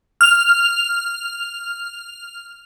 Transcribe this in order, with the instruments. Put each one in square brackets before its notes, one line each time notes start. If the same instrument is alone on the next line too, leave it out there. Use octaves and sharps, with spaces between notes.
[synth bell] F6 F7